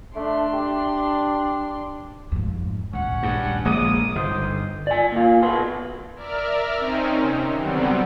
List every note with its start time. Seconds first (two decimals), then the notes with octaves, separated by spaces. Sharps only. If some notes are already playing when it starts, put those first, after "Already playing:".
0.16 A3 D4 C6
0.53 G4
2.32 F2 G#2
2.93 A#1 D#2 C#4 F#5
3.23 G2
3.65 A#1 G#3 C4 D6 D#6
4.15 G1 D#4 C5
4.87 D5 G#5
5.12 A#2 F4
5.43 B2 B3 B4 C6
6.15 A#4 D5 E5 F6
6.77 C4 C#4 D#4
7.17 C3 D#3
7.54 D3 F#3 G3 B3 C4